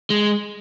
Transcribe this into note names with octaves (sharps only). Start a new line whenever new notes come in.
G#3